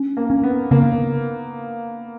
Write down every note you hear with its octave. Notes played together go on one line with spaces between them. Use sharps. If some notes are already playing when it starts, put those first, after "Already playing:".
Already playing: C#4
A#3
C#4
B3
C#3 A#3